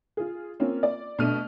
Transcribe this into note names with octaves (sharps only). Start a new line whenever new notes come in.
F4 G#4
A#3 C4 C#4 F4
D5
B2 A3 D4 F6 D#7